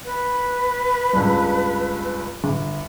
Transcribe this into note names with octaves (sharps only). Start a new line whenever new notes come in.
B4
C#2 G2
G1